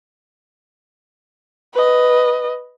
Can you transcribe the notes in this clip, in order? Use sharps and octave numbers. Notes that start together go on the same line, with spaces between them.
B4 D#5